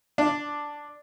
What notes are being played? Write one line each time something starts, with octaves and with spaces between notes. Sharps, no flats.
D4